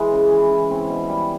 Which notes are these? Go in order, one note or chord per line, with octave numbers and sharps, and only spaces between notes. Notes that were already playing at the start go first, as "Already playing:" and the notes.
Already playing: E3 G#3
C#3
E3
E4
C4
B2
G3